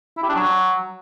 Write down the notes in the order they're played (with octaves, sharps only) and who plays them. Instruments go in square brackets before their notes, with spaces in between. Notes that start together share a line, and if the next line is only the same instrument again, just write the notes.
[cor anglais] E4
G4
D4
F#3